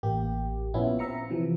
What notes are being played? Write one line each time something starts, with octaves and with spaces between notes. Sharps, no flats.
A1 A#3 G4
A#1 B3 C#4 E4 F4
C4 E5 A#5 C#7
C3 E3 F3